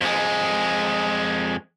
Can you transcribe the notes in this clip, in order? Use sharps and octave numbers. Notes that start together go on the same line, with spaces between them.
F2 G#3